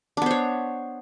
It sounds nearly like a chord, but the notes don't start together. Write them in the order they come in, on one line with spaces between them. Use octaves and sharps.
D4 B3 C5 C#5